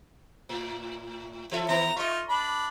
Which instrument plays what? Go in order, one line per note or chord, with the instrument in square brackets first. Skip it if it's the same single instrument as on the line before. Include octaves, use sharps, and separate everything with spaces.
[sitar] A2
E3 A4 E5
[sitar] D#3 B3 [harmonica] A#5
[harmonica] D#4 F4 C#6 [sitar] D#5 E5
[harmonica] D4 B5